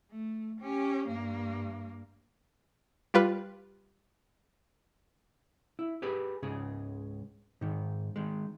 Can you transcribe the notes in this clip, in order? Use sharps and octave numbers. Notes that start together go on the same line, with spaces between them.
A3
C#4 G4
G2 A#3
G3 F4 B4
E4
G4 G#4 B4
C#2 G#2 C#3 G#4
G#2 D#3
D#3 G#3